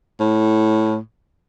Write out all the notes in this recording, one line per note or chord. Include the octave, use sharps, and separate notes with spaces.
A2